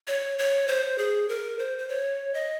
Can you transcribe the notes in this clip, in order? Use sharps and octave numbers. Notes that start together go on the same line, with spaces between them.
C#5
C#5
C5
G#4
A#4
C5
C5
C#5
D#5